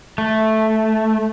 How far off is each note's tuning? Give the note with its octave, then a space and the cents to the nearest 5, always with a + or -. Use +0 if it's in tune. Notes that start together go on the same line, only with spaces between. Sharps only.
A3 -5